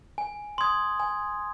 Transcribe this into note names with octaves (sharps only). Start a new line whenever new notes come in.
G#5
C6 D#6 G#6
G#5